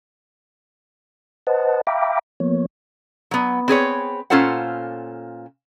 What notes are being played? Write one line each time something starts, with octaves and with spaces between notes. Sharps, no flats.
B4 C5 D#5 F#5 A5
E5 F5 G5 A#5 B5 D6
F3 A#3 B3 C#5
F#3 B3
C4 G#4 B4 C#5
A#2 C#4 F4 A4 C5 F#5